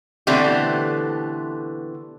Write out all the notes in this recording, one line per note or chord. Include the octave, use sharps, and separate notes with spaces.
B2 D3 E3 A3 C4 G4